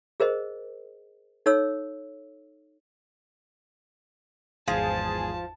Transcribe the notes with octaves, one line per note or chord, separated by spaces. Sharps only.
G#4 A#4 C5 D#5
D#4 A4 C#5 E6
G#1 E2 F3 G#4 A5